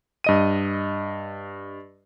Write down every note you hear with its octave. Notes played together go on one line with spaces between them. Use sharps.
G2 D#5 D#7